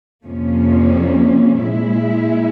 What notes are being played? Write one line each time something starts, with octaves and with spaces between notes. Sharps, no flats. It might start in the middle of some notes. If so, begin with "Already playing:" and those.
F2 C3 F3 A#3 C#4
A#2 G#3 E4